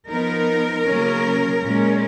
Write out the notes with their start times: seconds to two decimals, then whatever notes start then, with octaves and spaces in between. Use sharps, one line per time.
0.10 F3 B3 D#4 A#4
0.88 C#3 F#3 A#3 C#4
1.64 A#2 G#3 C#4